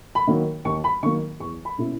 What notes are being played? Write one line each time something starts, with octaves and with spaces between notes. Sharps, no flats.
B5
D#3 F#3 A#3
D#2 C#6
B5
D#3 F#3 A#3 C#6
E2 C#6
B5
B2 A#3 C#4 E4